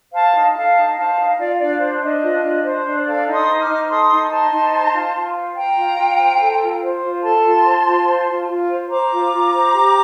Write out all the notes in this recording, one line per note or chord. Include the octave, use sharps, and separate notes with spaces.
C5 F5 A5
D#4
A4 F5 A5
D#4
C5 F5 A5
D#4
F4 D5 F5
D4 D5 F5
C5
D4 D#5
F4
D4
C5
D4
A4 D5 F5
D#4
C6 D#6
C5
D6 F6
D#4
A4 C6 D#6
D#4
C5 A5 C6
D#4
C5
F4
F4
C5
C5 G5 A#5
F4
F4
C5
A4
F4
C5
F4
A4 A5 C6
F4
C5
F4
C5
F4
F4
C5
C5 A#5 D6
F4
F4
C5
G4